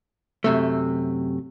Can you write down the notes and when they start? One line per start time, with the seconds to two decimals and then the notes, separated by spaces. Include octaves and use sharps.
0.44 F#2 C3 A3